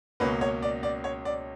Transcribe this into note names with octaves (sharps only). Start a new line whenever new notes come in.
C#2 B2 A#3 C#4 B4
C#5
D5
D5
C#5
D5